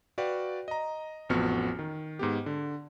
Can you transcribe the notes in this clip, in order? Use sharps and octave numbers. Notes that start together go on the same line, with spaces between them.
F#4 B4 D5 F5 G5
D#5 A#5
A1 F2 B3 F#4 F6 C#7
D#3
G#2 B3 G4
D3